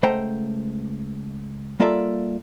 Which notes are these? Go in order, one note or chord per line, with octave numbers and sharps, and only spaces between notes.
C#2 A3 C5 F#5 G5 A#5
G3 A#3 F4 A4 D5 E5